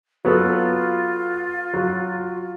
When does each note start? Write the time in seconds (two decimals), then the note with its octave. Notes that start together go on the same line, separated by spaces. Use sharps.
0.25 F#3 B3 F4 A4
1.74 F#3